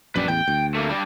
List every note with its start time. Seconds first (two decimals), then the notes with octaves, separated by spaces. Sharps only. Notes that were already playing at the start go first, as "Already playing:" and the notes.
0.15 A#1 F#2 B4 D5
0.28 A1 E2 G5
0.48 D2
0.74 A3 A#3
0.89 G3 D4